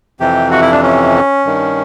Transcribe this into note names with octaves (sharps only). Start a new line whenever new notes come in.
F2 C3 E3 G4
F#4
E4
D4
C#4
G2 D#3